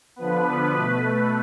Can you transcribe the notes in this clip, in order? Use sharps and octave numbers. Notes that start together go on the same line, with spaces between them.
D3 F3 B3 B4
B2 A3